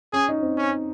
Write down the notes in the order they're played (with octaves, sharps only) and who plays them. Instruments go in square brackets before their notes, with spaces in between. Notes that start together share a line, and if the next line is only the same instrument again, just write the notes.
[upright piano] C#4 [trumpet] G#4
[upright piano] D#4
C4
[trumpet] C#4